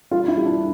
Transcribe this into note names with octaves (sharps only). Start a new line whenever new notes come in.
G3 F4
E4
G3
D4